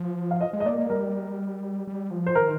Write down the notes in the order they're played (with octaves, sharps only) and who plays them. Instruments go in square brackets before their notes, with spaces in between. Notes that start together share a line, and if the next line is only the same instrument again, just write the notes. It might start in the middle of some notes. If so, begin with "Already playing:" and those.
Already playing: [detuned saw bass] F3
[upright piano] F5
D#5
[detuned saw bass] G#3
[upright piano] D#5
[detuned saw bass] A#3 [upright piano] D5
[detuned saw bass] A#3
[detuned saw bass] G3 [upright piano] A#4
[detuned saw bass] G3
F3
[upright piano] C5
[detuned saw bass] D#3 [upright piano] A#4